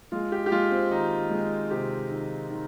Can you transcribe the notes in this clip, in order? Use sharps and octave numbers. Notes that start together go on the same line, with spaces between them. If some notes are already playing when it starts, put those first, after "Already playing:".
G#3 F4
G4
G4
G#3 F4
C4
D#3 D#4
G#3
C3 G4
D#3
D#3